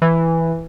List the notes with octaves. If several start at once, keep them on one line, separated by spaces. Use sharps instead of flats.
E3